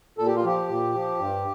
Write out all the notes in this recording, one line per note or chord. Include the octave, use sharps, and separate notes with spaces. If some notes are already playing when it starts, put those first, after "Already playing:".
A#2 A4
G4
F4
F3 G4
A#2
F3
G2